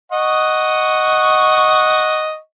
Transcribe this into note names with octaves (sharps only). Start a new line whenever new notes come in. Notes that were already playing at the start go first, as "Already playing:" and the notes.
D#5 F#5 C#6